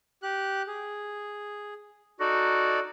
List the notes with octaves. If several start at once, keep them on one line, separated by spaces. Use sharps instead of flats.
G4 F#6
G#4
D#4 F#4 A4 D5